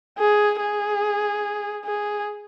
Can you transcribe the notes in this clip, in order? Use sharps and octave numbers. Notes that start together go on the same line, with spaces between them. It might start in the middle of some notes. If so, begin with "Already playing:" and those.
G#4
G#4
G#4